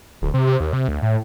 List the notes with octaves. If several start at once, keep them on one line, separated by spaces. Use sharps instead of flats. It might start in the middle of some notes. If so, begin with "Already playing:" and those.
D1
C3
C3
D#2
C3
D2
A2